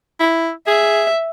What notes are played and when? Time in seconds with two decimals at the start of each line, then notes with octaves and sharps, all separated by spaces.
0.20 E4
0.67 G#4 E5